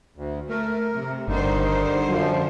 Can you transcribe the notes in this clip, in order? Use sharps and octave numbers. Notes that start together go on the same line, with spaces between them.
D2
A3 A#4
C3
G1 D3 D#3 G3 D#4 C5
F#2 F3 F#3